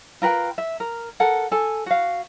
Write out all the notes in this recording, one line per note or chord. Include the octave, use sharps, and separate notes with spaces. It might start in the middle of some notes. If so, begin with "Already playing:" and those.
F4 A#4 B4 G5
E5
A#4
A4 A#4 F#5
A4 G#5
F#4 F5